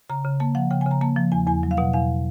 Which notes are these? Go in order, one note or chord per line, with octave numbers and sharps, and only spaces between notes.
C#3 A#5
C#3
A#3 A5
F3 F#5
C#3 G5
G#5
C#3
A#5
A#3 A5
F3
E2 G#5
E2 G#5
F#3
F5
B2 F#5
E2 F5